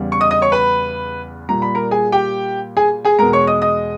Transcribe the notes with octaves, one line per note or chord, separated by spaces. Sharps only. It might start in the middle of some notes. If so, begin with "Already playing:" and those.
Already playing: E2 C#3 G3
C#6
D#5 D#6
D#5 D#6
C#5 C#6
B4 B5
A#2 G3 A#5
B5
A#4 A#5
G#4 G#5
G4 G5
G#4 G#5
G#4 G#5
E2 B2 G#3 A#4 A#5
C#5 C#6
D#5 D#6
D#5 D#6